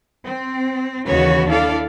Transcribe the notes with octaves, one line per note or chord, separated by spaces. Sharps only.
C4
D#2 C#3 E3 F#4 B4 C#5
D4 E4 A4 D5 F5